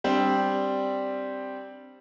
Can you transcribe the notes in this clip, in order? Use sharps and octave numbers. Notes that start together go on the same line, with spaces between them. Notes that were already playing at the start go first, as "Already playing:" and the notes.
G3 C4 D4